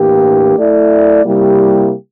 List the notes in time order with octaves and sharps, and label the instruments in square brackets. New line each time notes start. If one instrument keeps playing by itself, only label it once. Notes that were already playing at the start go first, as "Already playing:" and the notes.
Already playing: [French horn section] A2 E3 A#3 D4 G4
A3 E4 A4 D5
C3 G3 A#3 E4 G4